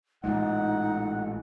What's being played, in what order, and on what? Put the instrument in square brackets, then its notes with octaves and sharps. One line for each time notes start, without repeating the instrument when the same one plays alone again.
[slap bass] A1 A#2 G#3 [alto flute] D#4 [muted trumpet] F#5